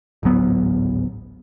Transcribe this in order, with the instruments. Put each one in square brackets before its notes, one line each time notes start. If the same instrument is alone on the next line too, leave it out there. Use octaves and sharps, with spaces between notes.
[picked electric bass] D1 G#1 F#3 B3